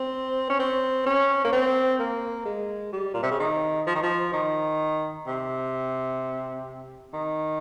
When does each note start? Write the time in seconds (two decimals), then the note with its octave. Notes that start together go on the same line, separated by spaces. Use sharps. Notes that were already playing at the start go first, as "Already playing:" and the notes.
Already playing: C4
0.50 C#4
0.60 C4
1.06 C#4
1.45 A#3
1.53 C4
1.99 A#3
2.46 G#3
2.93 G3
3.14 A#2
3.23 C3
3.31 C#3
3.40 D#3
3.87 F3
3.95 D#3
4.03 F3
4.33 D#3
5.27 C3
7.14 D#3